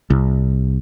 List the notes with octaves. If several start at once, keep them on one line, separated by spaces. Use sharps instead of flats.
C2